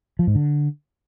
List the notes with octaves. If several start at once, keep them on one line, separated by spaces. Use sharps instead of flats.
F3
G#2
D3